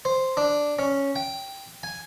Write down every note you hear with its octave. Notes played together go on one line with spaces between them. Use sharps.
C5
D4
C#4
G5
G#5